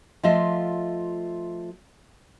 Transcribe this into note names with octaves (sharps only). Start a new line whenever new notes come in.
F3 A3 F4 D#5 E5